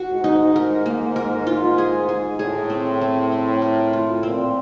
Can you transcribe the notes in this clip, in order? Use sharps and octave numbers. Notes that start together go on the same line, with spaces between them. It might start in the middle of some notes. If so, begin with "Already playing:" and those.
Already playing: F#4
G#2
D#4
A#4
A#3
A#4
F4
G#4
G#4
A2 G#4
C4
C4
C4
A#4
F4
A#2 C4